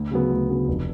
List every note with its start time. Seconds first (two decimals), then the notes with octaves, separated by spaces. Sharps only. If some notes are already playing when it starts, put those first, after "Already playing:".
Already playing: D2
0.11 C#3 F#3 B3
0.30 D2
0.50 C#3 F#3 B3
0.68 F1